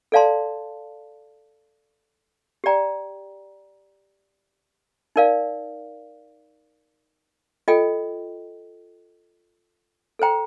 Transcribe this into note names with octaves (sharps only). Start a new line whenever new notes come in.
A4 D5 F5 A5 C6
G4 D5 G5 A#5
D#4 A#4 D5 F5
F4 A4 D#5 G5
A4 C5 G5 A#5